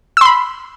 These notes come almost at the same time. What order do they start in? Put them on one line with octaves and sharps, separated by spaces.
E6 C6 B5